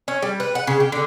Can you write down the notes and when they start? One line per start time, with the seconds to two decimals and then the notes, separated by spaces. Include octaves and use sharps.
0.08 C#4
0.22 G3
0.40 B4
0.55 F#5
0.67 C#3
0.80 G4
0.92 D3